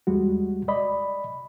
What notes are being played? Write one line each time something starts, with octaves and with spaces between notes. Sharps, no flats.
E2 G3 G#3 F#4
D5 D#5 B5